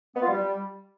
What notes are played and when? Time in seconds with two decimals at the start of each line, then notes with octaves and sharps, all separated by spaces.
0.15 B3
0.22 F4
0.28 G3